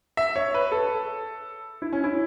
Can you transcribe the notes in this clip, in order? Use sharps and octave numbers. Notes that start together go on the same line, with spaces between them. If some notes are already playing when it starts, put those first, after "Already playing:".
E5
C#5
B4
A4
E4
C#4
E4